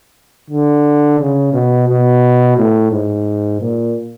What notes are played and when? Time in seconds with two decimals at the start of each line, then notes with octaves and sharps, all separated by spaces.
0.50 D3
1.19 C#3
1.53 B2
1.89 B2
2.57 A2
2.92 G#2
3.61 A#2